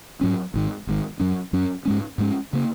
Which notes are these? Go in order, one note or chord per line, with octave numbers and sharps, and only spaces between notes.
G#2 F#3 C#4
G#1 G#2 D#3
G#1 G#2 D#3
F#2 F#3 C#4
F#2 F#3 C#4
G#2 G#3 C#4
G#2 G#3 C#4
C#3 A#3